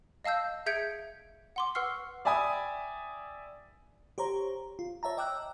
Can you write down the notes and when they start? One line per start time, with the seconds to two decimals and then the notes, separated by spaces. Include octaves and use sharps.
0.24 D#5 F5 A5 E6 G6
0.66 G#4 E5 G6 G#6 C#7 D7
1.56 F#5 C6 D6
1.75 B4 F#5 C#6 E6 F6 C7
2.25 D5 E5 G5 G#5 B5 D#6
4.18 G4 C5 C#5 A#5
4.79 F4
5.03 C#5 E5 A5 A#5
5.17 D#5 G5 D6 E6 F#6